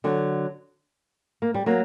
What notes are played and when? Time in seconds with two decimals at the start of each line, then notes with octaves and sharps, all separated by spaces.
0.04 D3 F#3
1.42 A#3
1.54 G3
1.66 F#3 A#3